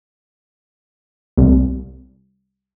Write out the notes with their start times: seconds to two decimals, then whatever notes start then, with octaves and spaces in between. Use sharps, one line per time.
1.38 C2